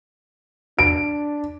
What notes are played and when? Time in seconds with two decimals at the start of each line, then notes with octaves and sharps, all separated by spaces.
0.79 D4 D7